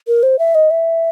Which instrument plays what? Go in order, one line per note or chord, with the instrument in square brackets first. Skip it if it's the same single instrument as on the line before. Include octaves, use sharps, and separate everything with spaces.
[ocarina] A#4
C5
E5
D#5
E5